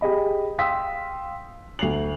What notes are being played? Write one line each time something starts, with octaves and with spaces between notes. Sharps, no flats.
G4 G#4 D#5 B5
F5 G5 C6 D#6 E6 B6
D2 C7 F7 F#7